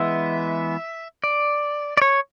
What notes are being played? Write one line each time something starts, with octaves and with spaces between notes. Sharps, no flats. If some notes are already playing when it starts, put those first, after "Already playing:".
Already playing: E3 G#3 B3 E5
D5
D5
C#5